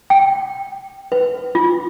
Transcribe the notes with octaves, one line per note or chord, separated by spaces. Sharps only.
G5
B4
F4